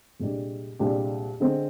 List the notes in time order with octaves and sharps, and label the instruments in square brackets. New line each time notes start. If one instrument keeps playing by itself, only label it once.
[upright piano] C2 A#2 G#3 D4 G4
C2 A#2 G#3 D4 G4
D3 G#3 C4